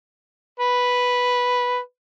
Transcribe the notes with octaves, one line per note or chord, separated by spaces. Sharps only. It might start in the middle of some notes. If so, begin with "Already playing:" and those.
B4